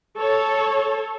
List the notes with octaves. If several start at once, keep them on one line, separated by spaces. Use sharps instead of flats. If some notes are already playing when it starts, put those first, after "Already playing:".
A4 C#5